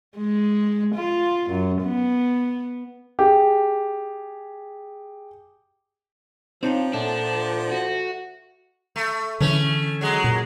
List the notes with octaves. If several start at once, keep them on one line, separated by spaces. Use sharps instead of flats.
G#3
F4
F#2
B3
G4 G#4
F3 C4 D4 D#4 C#5 F5
A#2 D4 A4 E5 F#5
F#4
A3
D3 E3 A3 C#4
F#3 G#3
A#2